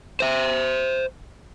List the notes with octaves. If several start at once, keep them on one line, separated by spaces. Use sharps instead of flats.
C5 E5